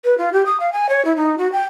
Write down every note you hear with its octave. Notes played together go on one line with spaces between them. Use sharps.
B4
F4
G4
D#6
F5
G#5
C#5
E4
D#4
F#4
G5